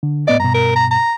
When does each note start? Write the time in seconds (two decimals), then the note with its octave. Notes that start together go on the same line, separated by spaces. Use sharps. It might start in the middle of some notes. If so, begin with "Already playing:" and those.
0.03 D3
0.28 A2 B3 D5 D#5
0.40 G2 B2 A#5
0.54 A#4
0.76 A#5
0.91 A#5